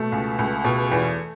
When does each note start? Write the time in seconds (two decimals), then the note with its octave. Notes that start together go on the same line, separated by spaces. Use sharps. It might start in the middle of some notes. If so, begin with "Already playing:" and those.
Already playing: B2 A3
0.12 C#2
0.39 C#2
0.64 B2
0.92 E2